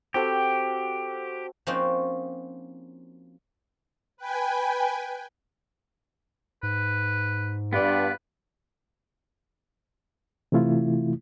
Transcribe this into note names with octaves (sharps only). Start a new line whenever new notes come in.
C4 F#4 G4 A4
F3 A#3 C4 C#4 D#4 F#4
B4 G5 G#5
G#2 B4
G2 B3 F4 B4 D5
C3 E3 A3 E4 F4